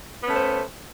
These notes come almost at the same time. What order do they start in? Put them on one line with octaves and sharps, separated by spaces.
B3 C#4 A3 C5